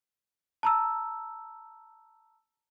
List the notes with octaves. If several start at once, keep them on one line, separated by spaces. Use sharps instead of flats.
A5 A#5 E6